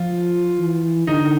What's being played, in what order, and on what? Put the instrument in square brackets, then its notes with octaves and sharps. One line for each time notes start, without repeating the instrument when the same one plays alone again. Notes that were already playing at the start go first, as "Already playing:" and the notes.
Already playing: [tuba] F3 [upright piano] F4
[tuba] E3
[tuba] D3 [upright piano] D#4